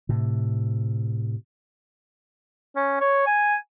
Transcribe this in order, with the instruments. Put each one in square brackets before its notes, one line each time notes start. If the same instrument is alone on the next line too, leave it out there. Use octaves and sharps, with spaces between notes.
[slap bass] A2 C3
[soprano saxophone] C#4
C#5
G#5